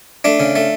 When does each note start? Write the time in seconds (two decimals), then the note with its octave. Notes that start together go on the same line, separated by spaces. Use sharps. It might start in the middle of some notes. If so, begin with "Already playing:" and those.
0.24 A3 D4
0.40 C#3
0.56 A3